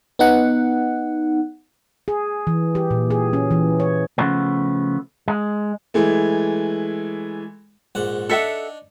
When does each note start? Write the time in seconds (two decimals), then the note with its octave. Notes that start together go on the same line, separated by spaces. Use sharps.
0.19 B3 D#4 F#5
2.08 G#4
2.47 E3
2.75 G4
2.91 A#2
3.10 G#4
3.33 C#4
3.51 E3
3.80 C#5
4.18 C#3 F3 A3 B3
5.28 G#3
5.94 E3 G#3 A3
7.95 A#1 G#2 F#5
8.29 D4 D#4 A4 E5 F#5